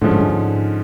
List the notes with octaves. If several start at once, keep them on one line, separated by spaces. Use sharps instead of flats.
A2 D3 F3 G#3 C#4
G#2
G2
G#2